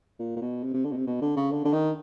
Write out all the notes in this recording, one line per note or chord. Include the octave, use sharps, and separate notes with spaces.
A#2
A#2
B2
C3
C3
D3
B2
C3
B2
D3
C#3
D3
D3
D#3